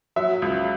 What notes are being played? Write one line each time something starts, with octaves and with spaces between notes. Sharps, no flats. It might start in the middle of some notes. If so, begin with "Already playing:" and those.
F#3 E5
C#2